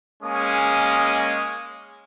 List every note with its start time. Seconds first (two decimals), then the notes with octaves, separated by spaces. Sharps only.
0.23 G#3 A#3 C#4 G#5 D#6